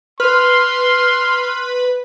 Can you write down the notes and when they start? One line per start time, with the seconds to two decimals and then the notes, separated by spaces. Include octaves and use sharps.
0.20 B4 C6 F6